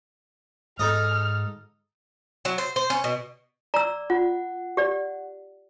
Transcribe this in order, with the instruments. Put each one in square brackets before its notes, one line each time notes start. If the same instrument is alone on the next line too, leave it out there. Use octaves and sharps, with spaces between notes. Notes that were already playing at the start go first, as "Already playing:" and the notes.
[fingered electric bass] G#2 [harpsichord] D#4 A4 D#5 [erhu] F6
[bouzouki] F#3
C5
C5
C#4
B2
[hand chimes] D5 [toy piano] A#5 E6
[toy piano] F4 [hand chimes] F#5
[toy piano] G4 D5